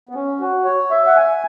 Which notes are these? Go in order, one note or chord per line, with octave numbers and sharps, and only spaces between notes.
B3
C#4
F#4
C#5
E5
F#5
G#5